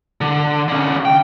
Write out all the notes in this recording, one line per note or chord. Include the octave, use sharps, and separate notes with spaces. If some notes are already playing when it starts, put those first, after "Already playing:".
D3
D3 C#4
G5